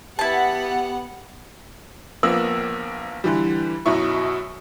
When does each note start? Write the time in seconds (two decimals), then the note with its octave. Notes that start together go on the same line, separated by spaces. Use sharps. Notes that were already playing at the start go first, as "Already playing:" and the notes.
0.19 B3 E4 G4 F#5 A5
2.23 A#1 F3 A#3 B3 E6 F#7
3.24 D3 E3 G3
3.86 F#2 B2 F#3 E4 C#6